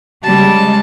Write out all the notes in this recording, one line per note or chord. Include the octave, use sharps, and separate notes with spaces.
C#3 G3 G#3 A5